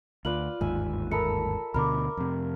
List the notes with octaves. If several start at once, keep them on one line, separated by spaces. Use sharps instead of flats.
D2 F4 B4 D5 F#7
G1 D#2 G#2 E5 G#5
A4 A#4 E5 A#5 B5 C#7
D2 B2 D3 A#4 B5 D6
F2 C3